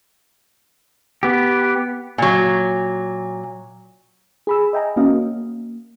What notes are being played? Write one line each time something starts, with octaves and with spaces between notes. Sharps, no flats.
B3 G4
A#2 F#3
G#4 B5 E6
D#5 E5 G5 G#5 A#5
A#3 C#4 F#4 D#5 F5
A#3